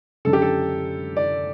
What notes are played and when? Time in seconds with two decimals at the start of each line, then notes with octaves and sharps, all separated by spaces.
0.25 F#2 D3 A4
0.33 G4
0.42 A4
1.17 D5